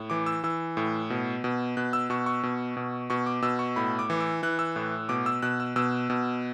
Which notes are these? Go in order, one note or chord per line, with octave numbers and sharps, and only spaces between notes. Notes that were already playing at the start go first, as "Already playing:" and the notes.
Already playing: A2
E3 D6
E6
E3 E6
A2
B2
B2
B2 F#6
E6
B2 C#6
C#6
B2
B2
B2 C#6
D6
B2 E6
C#6
A2 B5
D6
E3
E6
E3 F#6
E6
A2
B2 D6
E6
B2 F#6
E6
B2 E6
B2